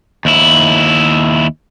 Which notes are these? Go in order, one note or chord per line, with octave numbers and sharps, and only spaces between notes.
D#2 E4